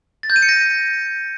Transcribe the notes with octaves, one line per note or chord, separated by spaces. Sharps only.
A6
G6
D#7
C#7
A#6